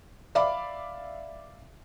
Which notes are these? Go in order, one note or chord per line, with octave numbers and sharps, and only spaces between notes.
D5 E5 F5 B5 D6